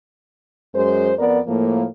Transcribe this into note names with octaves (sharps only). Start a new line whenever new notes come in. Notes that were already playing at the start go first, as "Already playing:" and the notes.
F#2 G#3 C5
F2 B3 A#4 D5
A2 F3 A#3